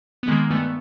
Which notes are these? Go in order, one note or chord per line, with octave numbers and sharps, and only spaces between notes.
B3
D#3 G#3 A#3
G2 A3 B3